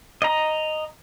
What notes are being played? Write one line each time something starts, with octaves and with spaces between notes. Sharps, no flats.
D#5 A#5